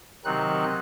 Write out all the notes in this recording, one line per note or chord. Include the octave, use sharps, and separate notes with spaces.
C3 D#3 F#3 C4 D#4 F#6